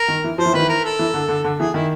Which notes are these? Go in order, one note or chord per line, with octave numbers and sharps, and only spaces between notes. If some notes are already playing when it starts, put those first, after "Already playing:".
Already playing: A#4
D#3
E3
F3 C5
E3
D#3 B4
E3
A#4
A4
E3
D3
D3
D3
E3 G#4
D#3 E4